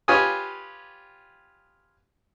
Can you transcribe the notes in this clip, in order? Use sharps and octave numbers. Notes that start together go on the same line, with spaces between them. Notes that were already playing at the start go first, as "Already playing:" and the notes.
F4 G4 B4 C#5 G#5 D#6